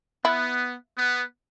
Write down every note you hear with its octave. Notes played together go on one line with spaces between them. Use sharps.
B3 E4
B3